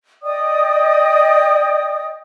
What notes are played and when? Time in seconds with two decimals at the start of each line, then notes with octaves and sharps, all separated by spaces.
0.23 D5 D#5 G5 D#6